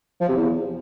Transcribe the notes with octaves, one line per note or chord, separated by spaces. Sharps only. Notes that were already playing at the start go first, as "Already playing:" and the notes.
F3
C3
E2